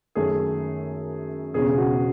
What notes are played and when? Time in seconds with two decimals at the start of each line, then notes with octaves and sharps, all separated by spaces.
0.15 F#2 D#3 A3 G#4
1.54 E1 E2 C#3 G#4
1.78 F#4